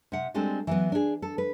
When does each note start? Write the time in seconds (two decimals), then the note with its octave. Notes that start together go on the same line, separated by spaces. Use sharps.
0.12 C3 F#5
0.34 G3 G#3 C4 D4 A4
0.67 E3 F#3 B3
0.92 D4 G#4
1.22 A4
1.38 B4